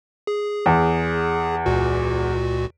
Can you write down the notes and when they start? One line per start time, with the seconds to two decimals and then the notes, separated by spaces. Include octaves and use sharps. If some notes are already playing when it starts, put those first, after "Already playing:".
0.27 G#4
0.66 E2
1.66 C#2 A#2 F#4